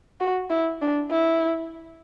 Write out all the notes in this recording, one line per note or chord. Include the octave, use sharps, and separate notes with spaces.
F#4
E4
D4
E4